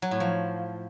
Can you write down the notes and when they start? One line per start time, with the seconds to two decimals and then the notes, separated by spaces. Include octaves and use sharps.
0.02 F#3
0.11 A2
0.20 F3